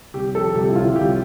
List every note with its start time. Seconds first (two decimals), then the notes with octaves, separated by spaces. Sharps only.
0.14 C2 G4
0.35 F3 A4
0.55 C2 G4
0.69 E4
0.75 C2 F4
0.95 C2 G4